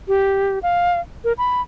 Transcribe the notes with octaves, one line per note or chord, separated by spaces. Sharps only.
G4
F5
A#4
B5